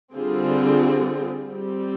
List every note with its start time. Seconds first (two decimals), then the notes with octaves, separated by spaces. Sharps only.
0.15 D3 G3 C4 F4 G#4
1.49 G3 C4 G4